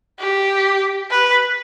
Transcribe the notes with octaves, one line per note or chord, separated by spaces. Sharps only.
G4
B4